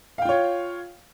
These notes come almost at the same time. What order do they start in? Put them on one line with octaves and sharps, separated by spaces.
F5 G5 F4 C#5